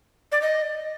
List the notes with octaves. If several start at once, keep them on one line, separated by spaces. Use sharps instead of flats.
D5
D#5